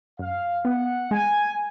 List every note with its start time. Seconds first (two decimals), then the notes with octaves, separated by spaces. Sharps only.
0.19 F#2 F5
0.65 B3 F#5
1.11 G#3 G#5